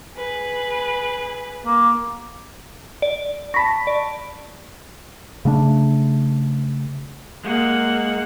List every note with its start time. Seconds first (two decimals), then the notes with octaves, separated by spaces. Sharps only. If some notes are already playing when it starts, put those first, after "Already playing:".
0.17 G#4 B4
1.67 A#3
3.02 D5
3.54 A5 B5 C#6 A#6 B6
3.87 D5
5.45 C#3 A3 A#3 D4
7.45 G#3 A#3 F#5